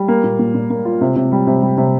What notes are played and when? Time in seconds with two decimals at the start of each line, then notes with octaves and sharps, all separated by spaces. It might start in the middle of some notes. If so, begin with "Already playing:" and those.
Already playing: G3
0.08 A#3
0.24 A#2
0.39 A#2
0.55 A#2
0.70 A#3
0.85 F4
1.01 C3
1.16 C3
1.32 G3
1.47 C3
1.62 G3
1.78 C3